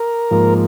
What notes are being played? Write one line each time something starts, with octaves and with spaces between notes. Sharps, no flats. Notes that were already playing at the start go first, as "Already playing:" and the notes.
Already playing: A#4
G#2 F3 A#3